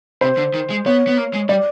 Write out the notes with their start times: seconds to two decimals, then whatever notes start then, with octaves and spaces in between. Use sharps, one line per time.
0.21 C3 C5
0.37 D3
0.54 D#3
0.70 G#3
0.86 B3 C#5
1.07 B3
1.17 A#3
1.33 G#3
1.49 G3 D5